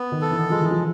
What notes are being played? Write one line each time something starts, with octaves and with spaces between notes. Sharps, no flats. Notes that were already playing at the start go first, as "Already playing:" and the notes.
Already playing: B3
D#3
A4
E3
F3 G#3
E3
F3